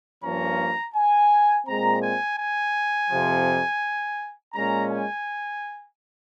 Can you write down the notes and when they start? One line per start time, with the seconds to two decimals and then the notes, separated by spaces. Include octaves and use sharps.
0.23 G2 F3 A#3 C#4 A#5
0.95 G#5
1.67 A#2 G#3 C4 A#5
2.03 G#5
2.39 G#5
3.10 F2 C3 F3
4.54 A#2 G#3 C#4 A#5
4.89 G#5